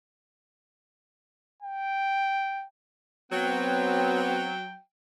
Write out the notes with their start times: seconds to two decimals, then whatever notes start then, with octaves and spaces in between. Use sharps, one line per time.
1.62 G5
3.32 F#3 B3 C4 G5